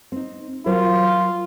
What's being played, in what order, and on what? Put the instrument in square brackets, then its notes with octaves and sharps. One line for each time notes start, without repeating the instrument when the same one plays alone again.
[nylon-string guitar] C4 D#4
[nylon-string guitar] F#3 A#4 C5 [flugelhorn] F4